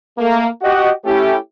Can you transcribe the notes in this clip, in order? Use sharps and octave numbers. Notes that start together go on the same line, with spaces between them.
A3 A#3
F#4 G4 D#5 F#5
A3 C#4 E4 G4